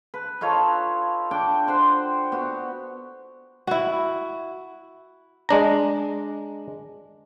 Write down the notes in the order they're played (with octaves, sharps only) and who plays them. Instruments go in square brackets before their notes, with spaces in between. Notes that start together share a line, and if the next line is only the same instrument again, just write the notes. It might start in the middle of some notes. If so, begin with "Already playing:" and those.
[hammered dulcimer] B4
D#4 F4 A4 C#5
D4 G5 D6
C5 F#5 G5 C6
B3 F#4
[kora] E4 F#4
[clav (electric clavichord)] G#3 D4 A#5